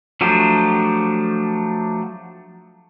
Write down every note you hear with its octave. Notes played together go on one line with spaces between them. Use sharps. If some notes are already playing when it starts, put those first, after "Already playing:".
F3 F#3 A3 D4 G4